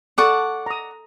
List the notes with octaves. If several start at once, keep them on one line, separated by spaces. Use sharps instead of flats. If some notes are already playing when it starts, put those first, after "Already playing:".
A4 D5 F#5 A5 C#6 D#6
A#5 D#6